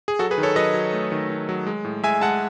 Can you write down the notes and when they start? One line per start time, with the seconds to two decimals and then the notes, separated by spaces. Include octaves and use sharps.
0.08 G#4
0.19 F#3 F#4 A4
0.31 G#4 B4
0.38 D#3
0.43 A4 C#5
0.56 F#3 B4 D#5
0.74 F#3
0.93 A3
1.12 D#3
1.30 D#3
1.49 F#3
1.67 G#3
1.84 A2
2.03 G#3 E5 G#5
2.21 G#3 F#5 A5